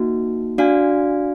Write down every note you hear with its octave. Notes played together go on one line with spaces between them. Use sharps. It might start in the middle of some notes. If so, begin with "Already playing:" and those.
Already playing: A#3 D#4 F#4
D4 F#4 D5 F5 G#5